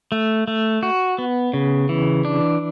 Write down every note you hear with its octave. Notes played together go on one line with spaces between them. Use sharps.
A3
A3
F#4
B3
C#3
E3
D4